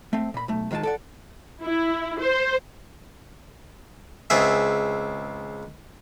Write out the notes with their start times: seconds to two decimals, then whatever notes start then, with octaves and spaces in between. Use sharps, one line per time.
0.13 A3 C4
0.34 A#2 B5
0.48 B1 A3
0.71 G#2 D#3 G#3 F4 A5
0.83 A4 D5 F#5
1.62 E4
2.18 C5
4.30 C#2 C4 G#4 E5